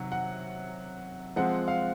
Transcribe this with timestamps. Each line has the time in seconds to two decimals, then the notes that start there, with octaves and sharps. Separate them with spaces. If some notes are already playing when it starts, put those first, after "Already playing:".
Already playing: C3 D#3 F#3 F#5
0.12 F#5
1.36 F3 G#3 C4 F#5
1.68 F5